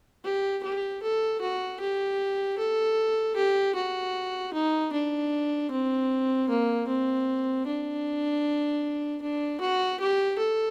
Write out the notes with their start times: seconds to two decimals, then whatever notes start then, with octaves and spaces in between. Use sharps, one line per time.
0.24 G4
0.63 G4
1.03 A4
1.41 F#4
1.80 G4
2.59 A4
3.36 G4
3.75 F#4
4.54 D#4
4.93 D4
5.71 C4
6.49 A#3
6.88 C4
7.66 D4
9.22 D4
9.61 F#4
10.00 G4
10.39 A4